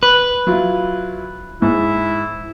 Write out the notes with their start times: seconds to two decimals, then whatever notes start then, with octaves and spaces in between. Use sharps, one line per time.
0.03 B4
0.47 F#3 E4 F4
1.62 G#2 E4